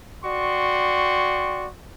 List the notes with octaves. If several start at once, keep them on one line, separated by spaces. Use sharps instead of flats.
F#4 D5 G5 C6 C#6